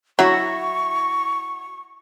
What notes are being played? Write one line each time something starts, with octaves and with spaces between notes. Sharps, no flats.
F#3 E4 F#4 C#6